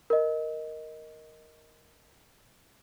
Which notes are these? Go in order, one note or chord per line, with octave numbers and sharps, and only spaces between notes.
A#4 D#5